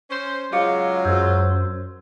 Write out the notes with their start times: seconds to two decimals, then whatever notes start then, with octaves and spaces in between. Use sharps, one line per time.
0.11 C#4 C5
0.53 C#3 F#3 G#3 F4 F5 D6 C#7
1.05 F#2 C5 E6 G6 G#6